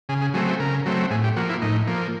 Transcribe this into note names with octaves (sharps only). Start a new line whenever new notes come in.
C#3 G#4
G#4
F#3 A3 C4 G#4
G#4
C#3 A#4
F#3 A3 C4
A2 G#4
G4
F3 A#3 F#4
E4
A2 D#4
F3 A#3